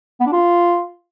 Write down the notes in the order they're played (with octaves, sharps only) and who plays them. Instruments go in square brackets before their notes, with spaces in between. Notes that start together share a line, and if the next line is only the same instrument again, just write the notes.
[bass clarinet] B3
D4
F4